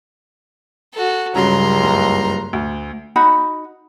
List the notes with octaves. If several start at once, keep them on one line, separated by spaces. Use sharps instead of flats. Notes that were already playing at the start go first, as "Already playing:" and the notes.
F#4 A4
C#2 G2 C#3 F#3 A#5 C6
F#1 G2
D2
D#4 F#4 B5